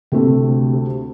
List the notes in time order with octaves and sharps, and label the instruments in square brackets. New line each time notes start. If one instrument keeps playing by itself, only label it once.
[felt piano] D2 A3 C4 [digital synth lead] C3